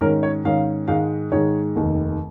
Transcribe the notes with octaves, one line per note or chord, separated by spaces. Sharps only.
G#2 D#3 C#4 A#4
C#5
G#2 D#3 C#4 F5
G#2 D#3 G#3 F5
G#2 D#3 G#3 C#5
F1 D#2 D#3